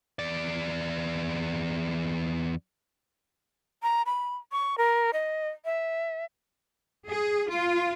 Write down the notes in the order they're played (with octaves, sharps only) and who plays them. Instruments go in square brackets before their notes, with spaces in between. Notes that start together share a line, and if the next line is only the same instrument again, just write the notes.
[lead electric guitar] E2 D5
[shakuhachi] A#5
B5
C#6
A#4
D#5
E5
[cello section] G#4
F4